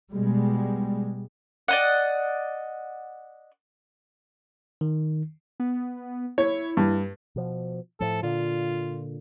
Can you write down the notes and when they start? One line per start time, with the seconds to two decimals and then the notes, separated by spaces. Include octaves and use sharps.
0.13 B2 G3 G#3
1.68 D5 D#5 F#5
4.81 D#3
5.60 B3
6.38 E4 C#5
6.77 G2
7.36 B2 F3
8.00 A2 F3 A4
8.23 A#2 D3 F4